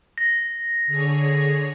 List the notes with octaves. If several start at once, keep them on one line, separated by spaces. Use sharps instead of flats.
A#6
D3 G#4 C#5